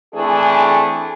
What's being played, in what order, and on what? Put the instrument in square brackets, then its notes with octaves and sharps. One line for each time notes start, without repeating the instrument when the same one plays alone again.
[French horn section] E3 A3 C4 D4 G#4 A4